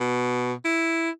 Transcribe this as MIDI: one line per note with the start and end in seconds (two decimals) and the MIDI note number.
0.01 0.53 47
0.65 1.10 64